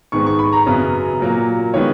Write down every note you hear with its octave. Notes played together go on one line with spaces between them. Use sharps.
G#2 D#3 G#3 B3 C#6
C#6
B5
A#5
F#2 C#3 F#3 B3
A#2 F#3 A#3
D#3 G#3 B3 C#5